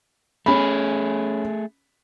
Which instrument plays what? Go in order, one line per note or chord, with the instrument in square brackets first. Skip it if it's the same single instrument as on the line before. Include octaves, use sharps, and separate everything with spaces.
[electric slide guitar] A3 G#4 [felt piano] C#4 B5